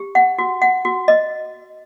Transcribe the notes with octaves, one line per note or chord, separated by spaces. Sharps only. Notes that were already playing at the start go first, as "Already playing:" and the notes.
Already playing: G4
F#5
F#4
F#5
F#4
D#5